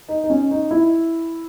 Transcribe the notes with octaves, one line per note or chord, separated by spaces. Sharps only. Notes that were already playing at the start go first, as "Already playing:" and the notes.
D#4
D#4
C#4
D#4
E4